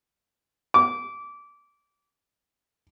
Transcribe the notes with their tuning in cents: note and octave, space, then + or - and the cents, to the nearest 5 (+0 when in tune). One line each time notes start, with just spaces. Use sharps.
D6 -20